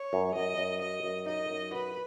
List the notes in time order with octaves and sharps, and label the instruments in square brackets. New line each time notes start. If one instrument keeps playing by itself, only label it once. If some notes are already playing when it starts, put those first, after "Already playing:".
Already playing: [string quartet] C#5
[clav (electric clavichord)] F#2
[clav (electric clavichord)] F#2 [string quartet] D#5
[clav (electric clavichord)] F#2
[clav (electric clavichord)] F#3 [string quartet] D#5
[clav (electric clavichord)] F#2
[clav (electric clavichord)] D#4 [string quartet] D#5
[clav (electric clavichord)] F#2
[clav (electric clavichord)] F#4 [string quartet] B4